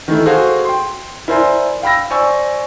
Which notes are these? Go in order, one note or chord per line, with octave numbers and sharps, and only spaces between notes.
D#3 E3 A3 E4
F#4 G#4 A4 C5 F5
G5 C6
E4 A#4 C5 D5 G#5 C6
F5 G5 B5 E6 A#6
C5 D5 G#5 C#6 E6